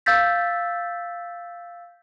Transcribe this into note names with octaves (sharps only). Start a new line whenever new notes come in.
F5 E6 G6 A6 B6